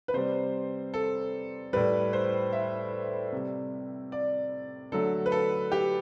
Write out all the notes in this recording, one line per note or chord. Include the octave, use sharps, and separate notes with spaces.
B4
C3 G3 C5
A4
A2 G3 B4
C5
E5
C3 G3
D5
D3 F#3 A3 A4
B4
A4
G4